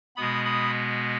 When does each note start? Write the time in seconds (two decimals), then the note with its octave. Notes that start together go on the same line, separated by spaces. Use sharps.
0.16 B2 G#3 B3 B5 D#6
0.45 B5 D#6